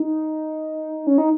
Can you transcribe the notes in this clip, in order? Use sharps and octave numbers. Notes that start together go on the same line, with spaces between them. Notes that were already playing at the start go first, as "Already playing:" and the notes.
Already playing: D#4
C#4
D#4